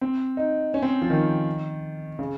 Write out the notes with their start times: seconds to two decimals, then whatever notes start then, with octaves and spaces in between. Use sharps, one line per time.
0.01 C4
0.37 D#4
0.74 C#4
0.82 C4
1.02 F3
1.10 D#3
2.19 C#3